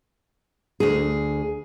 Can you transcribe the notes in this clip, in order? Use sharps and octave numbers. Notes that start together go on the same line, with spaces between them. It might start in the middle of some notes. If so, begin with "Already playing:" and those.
D2 G#4